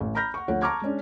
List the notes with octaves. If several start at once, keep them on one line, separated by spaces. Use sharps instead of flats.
A1
A#5 B5 F6 G6 A#6
F#5 C#6
D2 F3 C#5 F#5
A5 A#5 C#6 D6 F6 G#6
G#3 C#4 D4